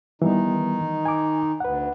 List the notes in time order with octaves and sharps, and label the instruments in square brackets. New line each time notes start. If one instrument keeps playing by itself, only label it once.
[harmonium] D#3 D#4 [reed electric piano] E3 G3 B3
[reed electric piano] G#5 D6
[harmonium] D2 [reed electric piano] B4 F#5